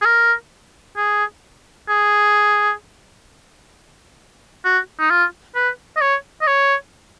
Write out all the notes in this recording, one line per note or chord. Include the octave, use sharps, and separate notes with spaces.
G#4
A#4
G#4
G#4
F#4
D#4
F4
B4
D#5
C#5
D#5
C#5